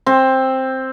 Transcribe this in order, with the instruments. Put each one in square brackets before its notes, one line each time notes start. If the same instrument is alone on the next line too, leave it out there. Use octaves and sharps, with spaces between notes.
[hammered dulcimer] C4